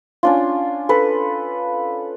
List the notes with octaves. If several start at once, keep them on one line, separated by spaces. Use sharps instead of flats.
C#4 D4 F4
A4 B4